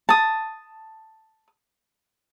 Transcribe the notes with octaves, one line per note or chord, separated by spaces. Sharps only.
A5 D#6